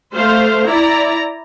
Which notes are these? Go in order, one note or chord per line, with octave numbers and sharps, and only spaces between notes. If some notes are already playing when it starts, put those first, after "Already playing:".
A3 C5 F5
E4 D5 A#5